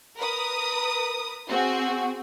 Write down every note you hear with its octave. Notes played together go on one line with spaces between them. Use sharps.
A#4 B4 D#6
C4 F#4 G#4